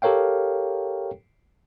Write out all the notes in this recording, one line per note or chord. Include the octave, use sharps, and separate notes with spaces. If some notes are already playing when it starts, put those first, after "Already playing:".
G4 A4 A#4 C#5 F5 G5